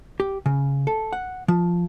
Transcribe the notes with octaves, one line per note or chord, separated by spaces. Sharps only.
G4
C#3
A4
F#5
F3